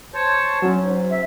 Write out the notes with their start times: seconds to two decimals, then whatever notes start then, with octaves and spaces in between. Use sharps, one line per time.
0.14 C5 C#5 A5
0.62 F#3 C#4
0.77 G#2
1.10 E5